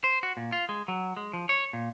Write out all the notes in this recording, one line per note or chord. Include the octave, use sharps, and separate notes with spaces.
C5
F#4
A#2
F4
G#3
F#3
G#3
F3
C#5
A#2